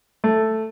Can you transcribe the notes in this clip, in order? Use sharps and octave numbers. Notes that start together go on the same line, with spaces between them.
A3